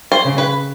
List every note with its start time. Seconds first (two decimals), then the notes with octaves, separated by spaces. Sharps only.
0.12 C5
0.25 C#3
0.38 B4